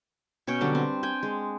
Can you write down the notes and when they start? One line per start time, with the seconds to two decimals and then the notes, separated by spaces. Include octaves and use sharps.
0.47 B2 C#4 C#5 G5
0.61 D3 F#3 G3 D4
0.75 C4
1.03 G5 G#5
1.23 G#3